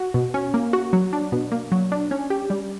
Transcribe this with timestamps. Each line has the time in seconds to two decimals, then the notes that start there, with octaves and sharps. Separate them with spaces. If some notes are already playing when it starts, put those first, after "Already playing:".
Already playing: F#4
0.14 B2
0.34 C#4
0.54 A#3
0.73 F#4
0.93 F#3
1.13 D4
1.32 B2
1.52 A#3
1.72 F#3
1.92 D4
2.11 C#4
2.30 G4
2.50 G3